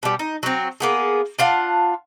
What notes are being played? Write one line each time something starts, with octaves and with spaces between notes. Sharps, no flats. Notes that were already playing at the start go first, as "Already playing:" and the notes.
B2 G3
D#4
F#3 C4
A#3 B3 G#4
D4 F4 F5 F#5